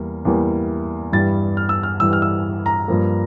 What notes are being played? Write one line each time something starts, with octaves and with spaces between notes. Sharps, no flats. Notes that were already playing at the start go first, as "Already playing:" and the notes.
Already playing: E2 E3 G3 A#3
E2 E3 G3 A#3
G2 E3 G3 A6
F6
E6
F6
G2 E3 G3 E6
F6
E6
A#5
G2 F3 A#3